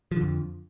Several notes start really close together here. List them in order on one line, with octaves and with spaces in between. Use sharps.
F3 D3 F2